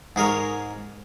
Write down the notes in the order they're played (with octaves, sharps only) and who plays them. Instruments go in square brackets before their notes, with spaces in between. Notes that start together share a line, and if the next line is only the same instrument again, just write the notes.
[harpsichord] G#2 G#4 A#4 C#5